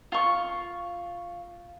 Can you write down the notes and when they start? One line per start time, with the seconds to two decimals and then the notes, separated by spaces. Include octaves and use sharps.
0.12 F4 C#6